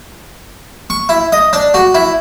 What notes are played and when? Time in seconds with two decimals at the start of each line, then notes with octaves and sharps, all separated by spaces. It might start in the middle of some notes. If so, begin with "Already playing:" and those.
0.90 C#6
1.09 E4
1.32 D#5
1.53 D4
1.74 F#4
1.95 E4